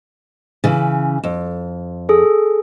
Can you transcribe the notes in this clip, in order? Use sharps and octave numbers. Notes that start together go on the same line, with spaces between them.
C#3 E3
F2
G#4 A4